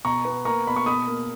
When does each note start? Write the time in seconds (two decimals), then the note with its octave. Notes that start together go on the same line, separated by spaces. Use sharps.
0.05 B2 A#5 C#6
0.25 B3
0.45 A#3 A#5 C#6
0.67 B2 B5
0.76 C#6
0.86 B2 B5 D#6
1.08 A#3